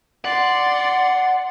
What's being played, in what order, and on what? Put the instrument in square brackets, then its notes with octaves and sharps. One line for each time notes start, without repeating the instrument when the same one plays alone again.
[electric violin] D5 C6 [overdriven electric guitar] F#5